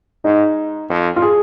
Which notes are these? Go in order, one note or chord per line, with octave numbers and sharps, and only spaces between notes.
G#2 D#4
F2
F4
G#4